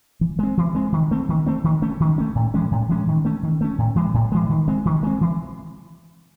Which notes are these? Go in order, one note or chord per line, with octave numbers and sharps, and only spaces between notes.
E3
G#3 C4
E3
G#3 C4
D#3
A3 C4
D#3
A3 C4
D#3
A3 C#4
D#3
A3 C#4
A2
E3 G#3 C#4
A2
E3 G#3 C#4
D#3
A3 C#4
D#3
A3 C#4
A2
E3 G#3
A2
E3 G#3
D#3
G#3 C4
D#3
G#3 C4
E3